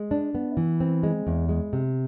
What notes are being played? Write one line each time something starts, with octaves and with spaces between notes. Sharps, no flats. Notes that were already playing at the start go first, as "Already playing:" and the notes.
Already playing: G#3
D4
B3
E3
C4
G#3
E2
G#3
C3